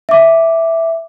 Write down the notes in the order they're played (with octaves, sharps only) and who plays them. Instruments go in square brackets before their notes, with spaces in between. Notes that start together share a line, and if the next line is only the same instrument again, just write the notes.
[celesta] E5 D6